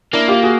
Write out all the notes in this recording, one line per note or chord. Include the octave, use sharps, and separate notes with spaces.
A#3 D4 E4
F4 G4
F#4 G#4